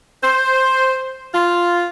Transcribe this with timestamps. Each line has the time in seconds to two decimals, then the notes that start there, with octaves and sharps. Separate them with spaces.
0.22 C5
1.33 F4